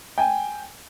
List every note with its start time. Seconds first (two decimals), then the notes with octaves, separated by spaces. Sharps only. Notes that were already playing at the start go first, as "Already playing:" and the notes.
0.18 G5 G#5